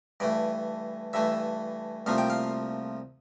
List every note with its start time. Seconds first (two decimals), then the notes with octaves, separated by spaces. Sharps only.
0.20 G2 E3 A3 D5
1.13 G2 E3 A3 E5
2.06 C2 A#2 F3 A3 F5
2.18 G5
2.30 F5